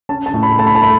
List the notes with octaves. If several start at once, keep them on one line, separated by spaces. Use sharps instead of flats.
C#4 A5
A5
A2
B5
A3 A5
B5
A5
A3 B5